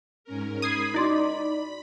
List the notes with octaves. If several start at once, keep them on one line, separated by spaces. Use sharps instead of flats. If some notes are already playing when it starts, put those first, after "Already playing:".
G#2 C#4 A#4
B5 D#6 G#6 C7
D#4 E4 F#4 D5 C6